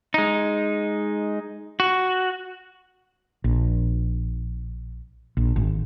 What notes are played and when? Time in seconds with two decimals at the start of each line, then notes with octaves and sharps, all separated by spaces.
0.14 G#3 D#4
1.80 F#4
3.44 A#1
5.37 A#1
5.56 G#1